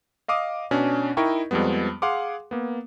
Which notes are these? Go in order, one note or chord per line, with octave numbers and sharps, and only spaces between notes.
D#5 F5 D6 D#6
B2 C#4 D4
D#4 E4 A#4 D#5 G5 C#6
F2 F3 G3 G#3 B3
G#4 F5 F#5 C6 D6
A#3 B3